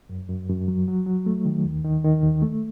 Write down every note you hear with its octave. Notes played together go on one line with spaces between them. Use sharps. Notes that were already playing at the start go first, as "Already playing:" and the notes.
F#2
F#2
F#2
F#3
F#3
F#3
A3
D#3
D#2
D#3
D#3
D#2
A3